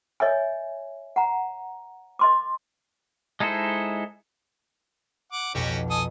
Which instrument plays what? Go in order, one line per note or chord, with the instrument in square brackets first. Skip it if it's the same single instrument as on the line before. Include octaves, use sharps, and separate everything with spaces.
[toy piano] C#5 D#5 E5 G#5
F#5 A#5
D#5 C6 D6
[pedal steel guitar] G#3 D#4 E4 A4 C5
[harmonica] F#5 D6
[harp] B1 F2 [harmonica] C#4 F#4 G4
[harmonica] A4 G#5 D#6